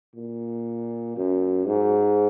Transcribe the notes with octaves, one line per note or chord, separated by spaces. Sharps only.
A#2
F#2
G#2